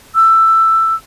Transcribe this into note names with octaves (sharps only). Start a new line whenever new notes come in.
E6